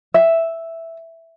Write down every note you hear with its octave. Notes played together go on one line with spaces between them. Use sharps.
E5